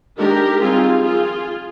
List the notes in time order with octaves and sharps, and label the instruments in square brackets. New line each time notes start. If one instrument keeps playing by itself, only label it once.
[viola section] D#3 G#3 D4 G4 A#4
D#3 G3 C4 F4 G#4
F3 C4 F4 G#4